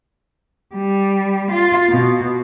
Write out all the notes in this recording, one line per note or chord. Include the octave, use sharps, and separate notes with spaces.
G3
F4
B2